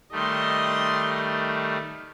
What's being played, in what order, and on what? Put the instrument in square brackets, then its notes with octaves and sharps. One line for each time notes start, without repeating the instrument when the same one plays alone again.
[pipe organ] D#3 G3 A3 [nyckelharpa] D#5 C6